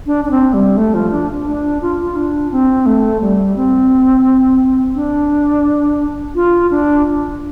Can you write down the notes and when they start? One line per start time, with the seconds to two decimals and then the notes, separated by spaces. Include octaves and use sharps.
0.06 D4
0.25 D4
0.31 C4
0.53 G3
0.77 A3
0.94 F3
1.11 D4
1.46 D4
1.82 F4
2.02 F4
2.16 D4
2.51 C4
2.86 A3
3.21 G3
3.56 C4
4.95 D4
6.35 F4
6.70 D4